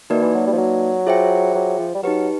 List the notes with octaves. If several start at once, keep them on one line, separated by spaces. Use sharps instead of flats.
D#3 A#3 D#4 F#4 B4 D5
E3
F#3
G3
F3
F#3
F4 G#4 C5 E5 G5
F#3
F3
G3
F#3 D#4 G4 B4